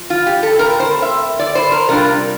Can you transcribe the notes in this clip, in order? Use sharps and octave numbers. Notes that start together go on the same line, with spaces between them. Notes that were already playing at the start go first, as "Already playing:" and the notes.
Already playing: F3
F4
G4
A4
A#2 A3 C4 A#4
C5
E5
D5
C5
A#4
C3 G3 D4 F4 A#4